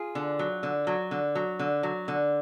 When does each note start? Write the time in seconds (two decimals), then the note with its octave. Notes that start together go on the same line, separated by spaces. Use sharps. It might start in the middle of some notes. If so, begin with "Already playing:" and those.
Already playing: F4 G#4
0.15 D3
0.39 F#3
0.63 D3
0.87 F#3
1.11 D3
1.35 F#3
1.59 D3
1.83 F#3
2.08 D3